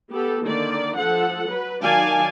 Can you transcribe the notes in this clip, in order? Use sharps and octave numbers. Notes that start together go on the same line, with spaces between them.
B3 G4 A4
D3 D#3 A#3 D5
F3 A4 F#5
F#3 B4
D#3 F#3 D5 F5 G#5 A5